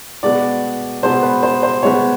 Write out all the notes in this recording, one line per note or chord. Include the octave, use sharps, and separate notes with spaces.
B2 G#3 B3 D5
B2 G#3 B3 C5
B4
C5
C5
B2 G#3 B3 C#5